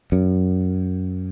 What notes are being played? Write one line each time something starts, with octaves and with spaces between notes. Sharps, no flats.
F#2